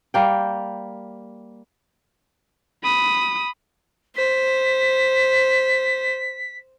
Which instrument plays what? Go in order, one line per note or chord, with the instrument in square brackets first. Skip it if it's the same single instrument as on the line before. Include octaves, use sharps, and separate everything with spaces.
[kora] G3 A#3 G5
[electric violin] B5 D#6
[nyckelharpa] C5 [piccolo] B6